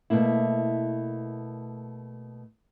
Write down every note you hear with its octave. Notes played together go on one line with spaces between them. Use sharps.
B2 A3 A#3 E4